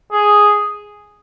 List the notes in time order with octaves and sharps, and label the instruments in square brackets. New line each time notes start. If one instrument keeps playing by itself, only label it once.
[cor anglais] G#4